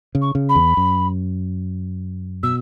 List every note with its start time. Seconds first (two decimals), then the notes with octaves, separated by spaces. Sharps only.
0.15 C#3
0.22 C#6
0.35 C#3
0.49 B5
0.55 E2
0.77 F#2
2.43 B2 E6